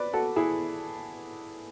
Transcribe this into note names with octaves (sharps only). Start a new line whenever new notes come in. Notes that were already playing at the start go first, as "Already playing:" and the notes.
Already playing: B4 D5
F#4 A4
E4 G#4